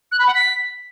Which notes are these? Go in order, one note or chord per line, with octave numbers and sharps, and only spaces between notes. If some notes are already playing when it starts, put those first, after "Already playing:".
F#6
B5
F#5
B6